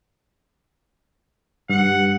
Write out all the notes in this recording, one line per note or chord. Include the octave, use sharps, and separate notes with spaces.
G2 F#5